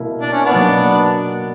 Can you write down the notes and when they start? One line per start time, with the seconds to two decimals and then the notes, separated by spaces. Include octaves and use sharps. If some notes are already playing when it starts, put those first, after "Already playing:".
Already playing: B2 A#3 E4 A#4
0.21 D4
0.33 C#4
0.45 B3 D4
0.51 B2 F#3 A#3